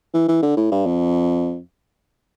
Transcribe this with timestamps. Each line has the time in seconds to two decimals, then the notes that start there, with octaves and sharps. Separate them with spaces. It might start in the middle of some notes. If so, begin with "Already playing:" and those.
0.14 E3
0.28 E3
0.42 D3
0.57 A2
0.72 G2
0.86 F2